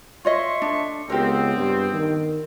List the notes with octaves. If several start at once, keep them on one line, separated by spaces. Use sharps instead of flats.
F4 C#5 D#5 E5 C6 C#6
D4 A4
C#2 B3 C4 G4 A#4
G2
D#3